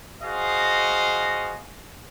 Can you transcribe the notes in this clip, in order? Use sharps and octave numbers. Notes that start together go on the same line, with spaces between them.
F#4 G#4 C5 D#5 F5